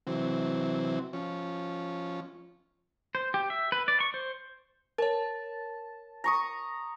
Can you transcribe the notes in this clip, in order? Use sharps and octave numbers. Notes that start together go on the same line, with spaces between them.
C3 E3 F#3 C4
F3 C#4
C5
G4
E5
B4
D5
C#6
C5
A#4 C#5 A5
A#5 C#6 D#6